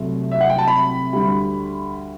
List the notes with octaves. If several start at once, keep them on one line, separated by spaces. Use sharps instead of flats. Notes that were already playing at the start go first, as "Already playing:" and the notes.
Already playing: C2 C3 F#3 A3
E5
F#5
G5
A5
B5
D2 D3 G3